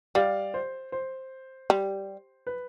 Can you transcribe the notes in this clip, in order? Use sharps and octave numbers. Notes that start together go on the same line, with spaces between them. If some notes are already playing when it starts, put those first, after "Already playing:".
G3 D5 F5
C5
C5
G3
B4